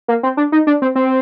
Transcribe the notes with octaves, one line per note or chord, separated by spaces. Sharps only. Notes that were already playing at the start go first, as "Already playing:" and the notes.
A#3
C4
D4
D#4
D4
C4
C4